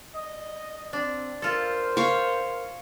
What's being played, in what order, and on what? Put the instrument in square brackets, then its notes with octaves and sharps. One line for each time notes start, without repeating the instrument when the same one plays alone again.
[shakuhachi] D5 [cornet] D#5
[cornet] C4 [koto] D4
[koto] F4 A4 [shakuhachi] A#4 [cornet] C5
[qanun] C#5 F5